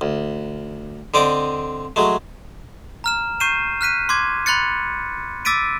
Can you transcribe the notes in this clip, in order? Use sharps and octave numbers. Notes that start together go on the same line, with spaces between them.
D2
D3 C4 D5 D#5 D6
F#3 G#3 A3
A#5 F6 E7
C#6 G6 C7 D#7 E7
F6 F#6 B6 D#7
C6 D6 G#6
B5 C6 F#6 A6 C#7
D6 E6 A6 B6 D7 D#7